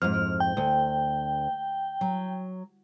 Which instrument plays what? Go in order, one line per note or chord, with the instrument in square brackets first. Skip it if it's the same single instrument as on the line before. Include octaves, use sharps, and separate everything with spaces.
[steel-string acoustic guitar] F2 G#2 [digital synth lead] F6
[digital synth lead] G5
[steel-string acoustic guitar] D2
F#3